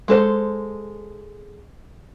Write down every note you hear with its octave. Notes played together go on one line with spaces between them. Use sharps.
G#3 A4 C5